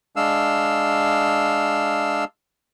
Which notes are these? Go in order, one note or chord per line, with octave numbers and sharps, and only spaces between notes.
G#3 D4 F5 E6